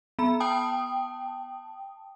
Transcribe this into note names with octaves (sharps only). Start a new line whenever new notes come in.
B3 B5
G5 A5 D#6